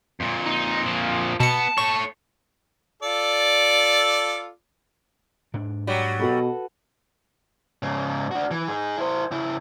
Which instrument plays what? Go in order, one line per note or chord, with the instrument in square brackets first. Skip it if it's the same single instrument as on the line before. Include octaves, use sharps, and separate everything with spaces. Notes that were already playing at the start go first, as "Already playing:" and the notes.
[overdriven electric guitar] F2 A#2
[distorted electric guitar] D#4
F3 A#3
[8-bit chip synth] B2 C#7 [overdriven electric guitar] B3 [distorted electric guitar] A5
[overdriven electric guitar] A4 C#5 [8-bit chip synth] C#6
[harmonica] F4 A4 D5
[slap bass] G#2 D4
[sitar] F#3 G3
[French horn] B2 [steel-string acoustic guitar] F#4 A4 B4
[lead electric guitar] G#2 C#3
D4 F#4
E3
D#4 G#4
E4 C5
C#3 E4